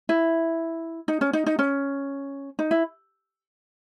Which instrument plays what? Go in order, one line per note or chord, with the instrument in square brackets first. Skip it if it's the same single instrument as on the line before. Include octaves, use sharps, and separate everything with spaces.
[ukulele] E4
D#4
C#4
D#4
D#4
C#4
D#4
E4